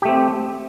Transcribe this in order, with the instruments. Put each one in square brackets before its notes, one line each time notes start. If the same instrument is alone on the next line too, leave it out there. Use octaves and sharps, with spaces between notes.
[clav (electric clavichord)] G4
A3
C4